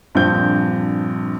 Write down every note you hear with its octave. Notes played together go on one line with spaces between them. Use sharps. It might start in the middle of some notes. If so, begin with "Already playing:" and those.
A#1 G2 C4 G6